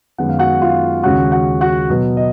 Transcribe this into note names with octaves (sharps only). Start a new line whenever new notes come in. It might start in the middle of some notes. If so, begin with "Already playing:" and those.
F#2 D#3 G#3 B3 F#5
F5
F#4 F#5
F4 F5
D#2 C#3 G#3 C#4 F#4 F#5
F#4 F#5
F#4 F#5
B2 F#3 B3
D#5